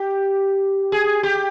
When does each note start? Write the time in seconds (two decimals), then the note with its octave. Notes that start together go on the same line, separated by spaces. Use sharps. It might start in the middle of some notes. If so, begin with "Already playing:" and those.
Already playing: G4
0.92 G#4
1.23 G4